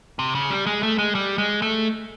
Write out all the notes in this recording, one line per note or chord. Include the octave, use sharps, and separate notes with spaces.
C3
C#3
G3
G#3
A3
G#3
G3
G#3
A3